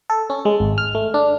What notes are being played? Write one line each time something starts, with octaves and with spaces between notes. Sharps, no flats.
A4
C#4
G#3
G#1
F6
A3
D4